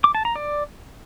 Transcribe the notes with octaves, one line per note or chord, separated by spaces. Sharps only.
D6
A5
A#5
D5